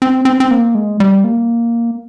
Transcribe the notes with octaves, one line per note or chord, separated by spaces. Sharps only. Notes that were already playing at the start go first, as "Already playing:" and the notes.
C4
C4
C4
A#3
G#3
G3
A#3